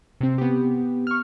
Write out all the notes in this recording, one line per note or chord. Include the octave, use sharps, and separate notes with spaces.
C3 C4
B3 G4
C#6 F6